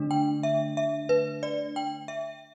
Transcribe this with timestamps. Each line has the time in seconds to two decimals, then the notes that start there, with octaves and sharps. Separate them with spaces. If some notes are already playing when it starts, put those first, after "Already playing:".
Already playing: D3 A3 D4
0.11 G5
0.43 E5
0.77 E5
1.09 B4
1.43 D5
1.76 G5
2.08 E5